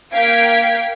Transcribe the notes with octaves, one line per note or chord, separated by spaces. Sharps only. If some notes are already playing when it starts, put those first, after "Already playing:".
A#3 F5 G5 G#6 B6 D7